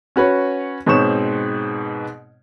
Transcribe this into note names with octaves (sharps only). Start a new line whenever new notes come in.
C#4 F#4 B4 C#5
G#2 B2 C4 C#5 C#6 E7